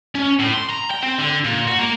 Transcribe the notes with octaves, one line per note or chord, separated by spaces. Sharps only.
C#4
A2
C6
A#5
G5
C4
D3
A#2
F#4
A#3